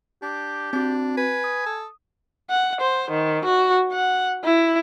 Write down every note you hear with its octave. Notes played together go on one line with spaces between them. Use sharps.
D4 G4
C4 D4 F#4
B4 G#5
D#6
A4
F#5
C5
D#3
F#4
F#5
E4